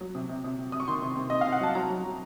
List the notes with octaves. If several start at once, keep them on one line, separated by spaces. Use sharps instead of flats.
F#3
C3
C3
C3
C3
C3 D#6
C#6
D#3 C6
C3
C3
C3 D#5
C3 F5
F#5
F#3 A5
F#3 A#5
F#3
F#3